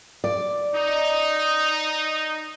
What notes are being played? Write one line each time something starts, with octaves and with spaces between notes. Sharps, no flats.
D5
D#4